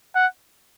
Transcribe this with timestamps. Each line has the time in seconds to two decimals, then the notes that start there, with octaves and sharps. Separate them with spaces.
0.16 F#5